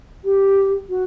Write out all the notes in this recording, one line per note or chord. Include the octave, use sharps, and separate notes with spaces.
G4
F#4